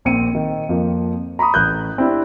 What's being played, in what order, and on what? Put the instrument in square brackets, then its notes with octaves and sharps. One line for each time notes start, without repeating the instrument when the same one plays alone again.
[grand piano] A#1 C4 C#7 D#7
D#3
F2 F3 A#3
A#5 B5 C#6 D#6
A1 F#6 G6
C4 D4 E4 G4